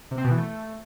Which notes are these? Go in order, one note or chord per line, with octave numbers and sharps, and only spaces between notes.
C3
C4
B2
E3
A3